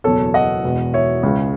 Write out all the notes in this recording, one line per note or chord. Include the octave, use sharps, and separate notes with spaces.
F#1 E2 B2 A4 C#5
D#5 F#5
E1 E2 B2
C#5 E5
C#2 C#3 G#3